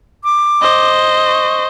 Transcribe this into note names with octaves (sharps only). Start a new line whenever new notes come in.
D6
C5 D#5
C#6